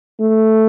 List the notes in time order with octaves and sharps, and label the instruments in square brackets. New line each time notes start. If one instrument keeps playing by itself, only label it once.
[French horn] A3